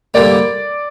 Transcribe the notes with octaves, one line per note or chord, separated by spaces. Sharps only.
G2 D3 G3 A#3 D5